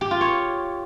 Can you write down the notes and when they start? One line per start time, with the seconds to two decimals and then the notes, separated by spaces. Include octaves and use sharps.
0.01 G4
0.11 F4
0.21 C#5